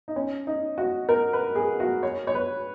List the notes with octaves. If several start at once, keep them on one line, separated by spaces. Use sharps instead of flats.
D#4
C#4
D#4
F#4
A#4
B4
G#4
F#4
C#5
C#5
B4